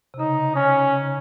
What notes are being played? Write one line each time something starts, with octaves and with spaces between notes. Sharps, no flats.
C3
C#3 D#4
C#4
C#3